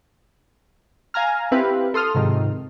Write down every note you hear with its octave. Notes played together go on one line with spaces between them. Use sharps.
F5 G#5 A#5 F6
C4 E4 G4 B4 F5
A4 C6 D#6 F6
G#2 C3 D#3 F3